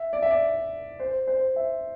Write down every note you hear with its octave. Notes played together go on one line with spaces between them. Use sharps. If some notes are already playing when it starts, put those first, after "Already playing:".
Already playing: E5
D5
E5
D5
C5
C5
E5